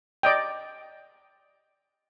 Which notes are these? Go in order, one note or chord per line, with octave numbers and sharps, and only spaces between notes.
D5 D#5 G5